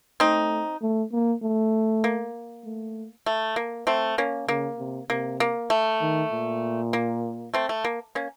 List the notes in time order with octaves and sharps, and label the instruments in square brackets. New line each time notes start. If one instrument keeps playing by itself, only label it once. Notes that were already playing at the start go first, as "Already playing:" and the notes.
[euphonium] A3 [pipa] C4 D#4
[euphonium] A3
A#3
A3
[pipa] A#3
[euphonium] A3
[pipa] A3
A#3
A3 C4
A#3 C#4
[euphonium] C#3 [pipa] A#3
[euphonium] C3
[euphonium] C3 [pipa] A#3
[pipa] A#3
A3
[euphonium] D#3
A#2
[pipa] A#3
A3 C4
A3
A#3
A#3 C#4